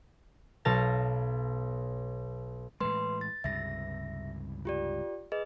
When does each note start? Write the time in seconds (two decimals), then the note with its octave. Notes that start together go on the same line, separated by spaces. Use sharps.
0.65 B1 B2 F5 A5 A#6
2.80 A2 E3 G#3 B4 C6
3.21 A6
3.44 C#2 G2 C3 E5 A#6
4.65 F4 G4 D5
5.32 G#4 B4 D#5